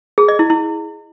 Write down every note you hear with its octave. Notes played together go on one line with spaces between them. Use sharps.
G#4
D#5
E4
E4